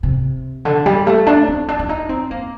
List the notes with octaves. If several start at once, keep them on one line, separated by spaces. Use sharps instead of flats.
C3
D3
G3
A3
D4
C4
D4
D4
D#4
C4
A#3